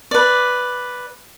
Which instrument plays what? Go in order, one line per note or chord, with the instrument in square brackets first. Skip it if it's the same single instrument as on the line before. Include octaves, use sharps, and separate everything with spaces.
[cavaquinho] B4 D5